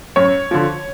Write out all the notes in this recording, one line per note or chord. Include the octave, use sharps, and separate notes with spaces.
F#2 C#5
D3 F3